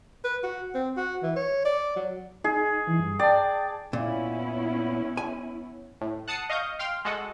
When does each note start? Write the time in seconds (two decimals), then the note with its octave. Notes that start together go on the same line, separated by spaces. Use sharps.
0.24 B4
0.43 F#4
0.74 C4
0.97 F#4
1.23 E3
1.36 C#5
1.65 D5
1.96 F#3
2.44 D#4 G#4
2.87 E3
2.99 G2
3.19 D5 G5 A5
3.93 A#2 B3 C#4 E4
5.17 G#5
6.01 A2
6.28 F#5 A5 D#6 C7 C#7
6.50 D#5 F5 C#6 D#6 G6
6.79 F5 G5 C6 F6
7.05 G#3 F#4 A4 D#5 F#5